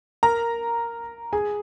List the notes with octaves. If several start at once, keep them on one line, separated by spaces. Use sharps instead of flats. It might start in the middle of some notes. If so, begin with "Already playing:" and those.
A#4 A#5
G#4 G#5